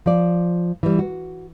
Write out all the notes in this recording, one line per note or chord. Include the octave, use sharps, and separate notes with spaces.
F3 D5
E3 G3
F#4